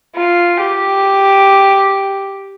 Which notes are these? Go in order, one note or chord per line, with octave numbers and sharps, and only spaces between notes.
F4
G4